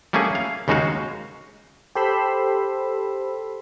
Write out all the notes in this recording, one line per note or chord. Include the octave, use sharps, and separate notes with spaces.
G3 A3 A#3 C#4 G#4
F5
D#2 C#3 G#3 D#4 F#4 F5
G4 A4 C5 B5 C6 E6